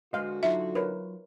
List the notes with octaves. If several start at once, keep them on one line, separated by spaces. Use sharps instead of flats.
D3 G#3 F#4 B4 C5 D#5 F5
F#3 D#4 F4 E5
A#4 B4 C#5